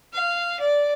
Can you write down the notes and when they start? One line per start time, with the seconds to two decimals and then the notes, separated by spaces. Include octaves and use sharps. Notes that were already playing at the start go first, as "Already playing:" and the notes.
0.13 F5
0.60 D5